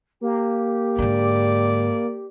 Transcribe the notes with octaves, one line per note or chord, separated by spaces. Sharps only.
A#3 G4
G#2 D3 D5